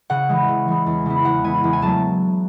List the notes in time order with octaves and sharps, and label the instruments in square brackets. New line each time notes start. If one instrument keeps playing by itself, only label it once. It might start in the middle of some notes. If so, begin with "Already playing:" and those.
[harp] C#3 F#5
E3 G#3
C#3
E3 G#3
E2
C#3 G#3 B3 E4
E2 F#5
C#3 G#3 B3 E4 G#5
E2
G#5
C#3 F#3 A3 A5